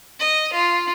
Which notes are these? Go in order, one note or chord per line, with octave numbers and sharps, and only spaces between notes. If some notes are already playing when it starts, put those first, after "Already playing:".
D#5
F4